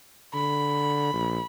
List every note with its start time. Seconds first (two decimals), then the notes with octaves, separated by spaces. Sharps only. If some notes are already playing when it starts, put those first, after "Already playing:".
0.34 D3 B5
1.13 A#1